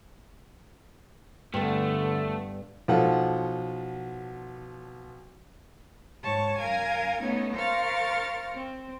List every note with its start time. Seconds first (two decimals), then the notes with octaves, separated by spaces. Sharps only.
1.54 G2 D3 A3 B3
2.88 B1 F3 A4 F#5
6.23 G#2 C#5 A5 C#6
6.58 F#2 A#4 F5 G#5 G#6
7.20 A3 B3 C#4 D#4
7.55 A#4 C5 F5 C#6 F6 A6
8.54 C4